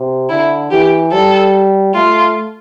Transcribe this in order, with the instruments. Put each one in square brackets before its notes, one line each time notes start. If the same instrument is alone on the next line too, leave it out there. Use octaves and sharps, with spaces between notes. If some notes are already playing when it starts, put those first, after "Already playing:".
Already playing: [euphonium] C3
[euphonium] D3 [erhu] E4
[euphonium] E3 [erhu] G4
[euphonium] G3 [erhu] A4
[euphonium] A3 [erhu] F4